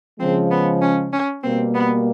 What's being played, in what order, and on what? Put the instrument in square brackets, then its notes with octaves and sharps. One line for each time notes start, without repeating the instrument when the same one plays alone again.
[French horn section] C#3 F3 G#3 [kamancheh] C4
[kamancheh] B3
C#4
C#4
[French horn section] B2 G3 A#3 [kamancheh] C4
[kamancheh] B3